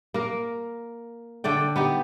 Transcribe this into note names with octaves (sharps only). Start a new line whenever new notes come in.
A#3 A#4
D3 A3 D5 G5
B3 D#4 G4